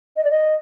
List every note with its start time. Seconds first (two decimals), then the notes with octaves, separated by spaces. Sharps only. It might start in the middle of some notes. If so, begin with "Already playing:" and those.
0.16 D#5
0.24 D5
0.30 D#5